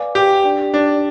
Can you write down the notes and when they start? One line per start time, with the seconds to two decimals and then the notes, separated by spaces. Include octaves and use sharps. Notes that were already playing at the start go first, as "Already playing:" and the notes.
Already playing: B4 D5 F5 G#5 D6
0.15 G4
0.44 D4 G4 D5 G5
0.74 D4